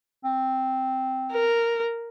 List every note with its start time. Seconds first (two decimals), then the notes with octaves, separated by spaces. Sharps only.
0.24 C4
1.32 A#4